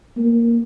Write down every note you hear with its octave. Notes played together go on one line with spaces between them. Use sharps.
A#3